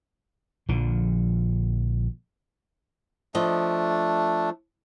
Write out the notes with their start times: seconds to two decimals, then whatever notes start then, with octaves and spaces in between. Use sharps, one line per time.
0.69 A#1 D3 F3
3.35 F3 A3 D4 D#5